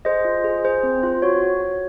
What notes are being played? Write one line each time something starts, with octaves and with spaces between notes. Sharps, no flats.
G#4 C5 D#5
F4
G#4
G#4 C5
C4
F4
F#4 C#5
F#4
F#4